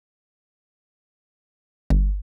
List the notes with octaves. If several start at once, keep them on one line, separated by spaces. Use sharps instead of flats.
G1